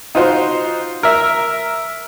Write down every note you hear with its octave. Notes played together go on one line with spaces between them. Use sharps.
D#4 F4 F#4 C5
A#4 E5